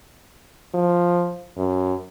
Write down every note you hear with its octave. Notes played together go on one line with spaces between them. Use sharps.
F3
F#2